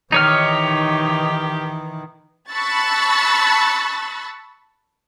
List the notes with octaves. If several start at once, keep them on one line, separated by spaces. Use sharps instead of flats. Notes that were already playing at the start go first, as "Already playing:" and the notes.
D#3 E3 D#4 G4 C#5 F6
A5 B5 C#6 E6 F#6 A6